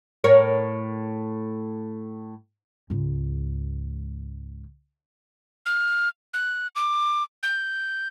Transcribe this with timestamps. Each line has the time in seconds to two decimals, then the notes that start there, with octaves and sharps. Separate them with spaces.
0.24 A2 A#4 C#5
2.90 C#2 G#2
5.66 F6
6.34 F#6
6.76 D6
7.43 G6